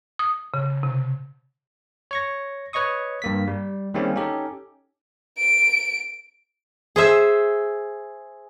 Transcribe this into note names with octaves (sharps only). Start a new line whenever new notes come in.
D#6
C#3
C3
C#5 C#6 A#6
B4 C#5 D#5 C#6 D#6
G2 A#3 B6
G3
D#3 G3 G#3 A#3 C4 C#4
C#4 D#4 G4 A4
D7
G#4 C5 E5